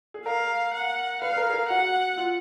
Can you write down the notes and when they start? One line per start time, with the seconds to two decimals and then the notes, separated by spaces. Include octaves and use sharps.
0.14 G#4
0.26 A#4 F5
0.73 F#5
1.22 B4 F5
1.32 B4
1.38 A#4
1.50 G#4
1.54 A#4
1.69 F#4 F#5
2.17 F4